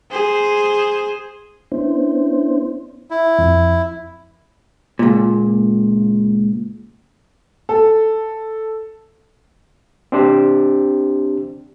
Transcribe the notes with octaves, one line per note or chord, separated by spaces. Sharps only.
G#4 C5
B3 C#4 D4 E4 C5
E4
F2
C#2 A#2
A4
C4 D4 G4 C5